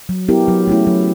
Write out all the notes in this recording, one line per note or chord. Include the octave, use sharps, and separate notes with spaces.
F#3
B3 E4 G4 A#4
F#3
A3 C#4 E4
F#3